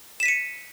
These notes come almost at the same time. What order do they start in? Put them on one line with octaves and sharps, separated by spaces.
E7 B6 D#7 C#7